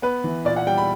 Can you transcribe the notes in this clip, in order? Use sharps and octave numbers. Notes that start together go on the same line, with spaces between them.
B3 B4
E3
A#2 D5
F#5
G3 G5
B5